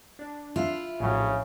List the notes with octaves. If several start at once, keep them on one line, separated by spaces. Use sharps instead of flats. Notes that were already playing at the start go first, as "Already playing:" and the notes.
D4
E4 F4 B4
A#1 A2 C#3 F#3